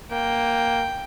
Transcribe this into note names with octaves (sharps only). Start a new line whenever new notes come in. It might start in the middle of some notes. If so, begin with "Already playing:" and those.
A#3 G5